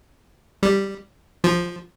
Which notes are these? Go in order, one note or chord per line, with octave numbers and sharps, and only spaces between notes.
G3
F3